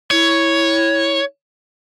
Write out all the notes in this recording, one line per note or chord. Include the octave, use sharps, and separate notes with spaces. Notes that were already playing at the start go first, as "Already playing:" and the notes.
E4 C#5